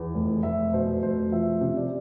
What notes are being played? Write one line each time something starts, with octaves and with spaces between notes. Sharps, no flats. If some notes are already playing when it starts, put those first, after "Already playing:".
Already playing: E2
F1
F1 E5
B2 C5
F1 C5
F3 E5
C3
D5